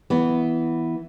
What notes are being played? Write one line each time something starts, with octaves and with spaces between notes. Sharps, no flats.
E3 B3